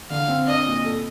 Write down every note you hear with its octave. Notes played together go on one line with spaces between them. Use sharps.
D3 F5
C4
D4 D#5
A#2
A4